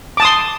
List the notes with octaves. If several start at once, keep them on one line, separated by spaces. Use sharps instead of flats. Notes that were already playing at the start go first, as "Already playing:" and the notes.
A5 C6 D6 D#6